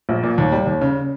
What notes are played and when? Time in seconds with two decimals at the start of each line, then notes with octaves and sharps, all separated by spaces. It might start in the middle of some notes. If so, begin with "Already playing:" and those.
0.09 A#1
0.23 A#2
0.38 D#2
0.52 G3
0.67 D#2
0.81 C#3